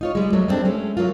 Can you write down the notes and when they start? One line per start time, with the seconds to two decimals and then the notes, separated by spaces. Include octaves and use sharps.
0.01 D#4 F4 C#5
0.15 G3 G#3
0.33 F2 F#3 G#3 A3
0.48 G3 B3 C4 D4
0.65 G#3 A3 C#4
0.97 F3 F#3 A#3 F4